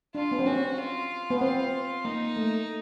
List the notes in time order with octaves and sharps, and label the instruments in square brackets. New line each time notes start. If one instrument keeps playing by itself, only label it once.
[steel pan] D4 [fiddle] F4
[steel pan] B3
C4
[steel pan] C#4 [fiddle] F#4
[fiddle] F4
[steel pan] B3
[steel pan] C4 [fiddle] F4
[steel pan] A#3 [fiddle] D#4
[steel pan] A3